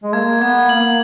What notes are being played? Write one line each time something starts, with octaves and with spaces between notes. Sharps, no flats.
G#3
A#3 G#6
B3 G#6
A#3 F#7